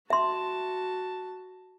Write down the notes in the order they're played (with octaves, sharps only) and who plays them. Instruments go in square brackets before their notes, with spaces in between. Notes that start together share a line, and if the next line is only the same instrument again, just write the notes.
[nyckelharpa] F#4 A5 [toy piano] E5 C6